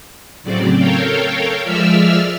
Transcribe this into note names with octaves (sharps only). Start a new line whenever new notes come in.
A2 C#3 F#3 C4 D5
A4 A#4 C#5 F5 G5
F3 G#3 D5 E5 E6 F6